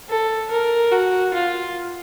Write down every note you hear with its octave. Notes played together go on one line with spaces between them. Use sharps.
A4
A#4
F#4
F4